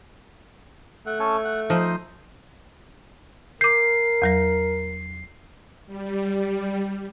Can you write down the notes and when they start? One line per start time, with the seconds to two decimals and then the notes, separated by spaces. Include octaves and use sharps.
1.06 A3 F#5
1.19 C#4 A4
1.45 F#5
1.70 F3 D#4 C5 D#5
3.61 A#4 D6 G6 C7
4.22 E2 F#3 A#6
5.86 G3